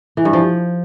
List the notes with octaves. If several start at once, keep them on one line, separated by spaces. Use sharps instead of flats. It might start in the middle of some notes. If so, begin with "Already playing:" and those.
E3
G2
F3